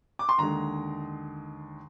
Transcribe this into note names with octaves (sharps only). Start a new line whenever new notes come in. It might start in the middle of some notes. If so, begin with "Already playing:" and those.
D6
C6
D#2 D3 G#3 A#5